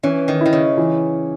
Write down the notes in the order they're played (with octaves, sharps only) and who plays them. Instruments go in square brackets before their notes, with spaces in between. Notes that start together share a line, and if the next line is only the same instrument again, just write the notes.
[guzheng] E3 [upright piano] C#4
[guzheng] D#3
[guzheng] D#3 [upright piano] E4
[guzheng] C#3
[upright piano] E3